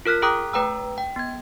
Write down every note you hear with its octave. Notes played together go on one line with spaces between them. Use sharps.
F4 A#4 F6 F#6 B6
G#4 G5 A#5 D6 D#6 F#6
A3 B4 G5 A#5 E6
G5
B3 G#6